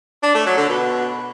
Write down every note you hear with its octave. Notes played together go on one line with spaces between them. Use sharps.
D4
A3
F#3
D3
B2